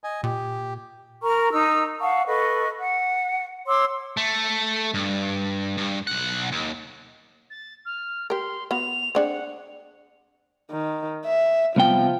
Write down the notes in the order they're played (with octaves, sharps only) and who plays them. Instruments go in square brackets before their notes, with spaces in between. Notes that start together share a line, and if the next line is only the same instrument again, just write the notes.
[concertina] D#5 G#5
[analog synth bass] A#2 [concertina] G4
[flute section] A#4 A#5 C#6 F6
D#4 A#5 E6
F5 F#5 A5 C#6
A4 B4 D#5 C#6
F#5
C#5 C6 D6 E6
[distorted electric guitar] A3
G2
G2
B1 F#5
D#2
[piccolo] A6
F6
[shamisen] G4 A#4 [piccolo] C6
[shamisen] B3 F#4 F5 [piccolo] F7
[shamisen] C4 D4 G#4 [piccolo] F#5
[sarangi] D#3
E5
[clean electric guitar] C2 B3 G5 [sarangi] F3